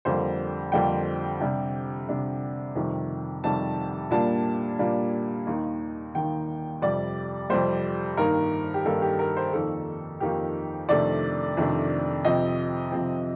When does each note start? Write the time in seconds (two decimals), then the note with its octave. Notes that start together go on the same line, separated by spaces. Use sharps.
0.05 F2 D3 G3 A#3 C5
0.72 F2 D3 G3 A#3 G5
1.41 C3 G3 D4
2.08 C3 G3 D4
2.75 F2 C3 D#3 G3
3.44 F2 C3 D#3 G3 A5
4.11 A#2 G3 A#3 D4 A5
4.79 A#2 G3 A#3 D4
5.47 D#2 D#3 A#3 D#4
6.15 D#2 D#3 A#3 D#4 G5
6.82 F2 C3 G3 D5
7.50 F2 C3 G3 C5
8.17 G2 D#3 A#3 D#4 A#4
8.74 G4
8.85 G2 D#3 A#3 D#4 A4
9.02 G4
9.19 A#4
9.37 C5
9.53 F2 D#3 A#3 D#4 A4
10.20 F2 D#3 A#3 D#4 G4
10.89 F2 C3 D#3 A3 D4 D5
11.57 F2 C3 D#3 A3 D4
12.24 F2 C3 F3 C4 D#5
12.92 F2 C3 F3 C4